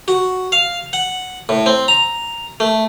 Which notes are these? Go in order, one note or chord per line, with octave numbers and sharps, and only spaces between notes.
F#4
F5
F#5
A2
C4
A#5
A3